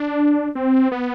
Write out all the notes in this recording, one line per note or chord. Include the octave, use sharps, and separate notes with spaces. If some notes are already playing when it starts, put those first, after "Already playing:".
Already playing: D4
C4
B3